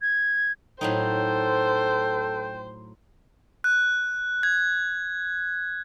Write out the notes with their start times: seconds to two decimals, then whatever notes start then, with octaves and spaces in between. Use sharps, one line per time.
0.01 G#6
0.81 A2 F#3 D#4 A4 C5 G5
3.64 F#6
4.43 G#6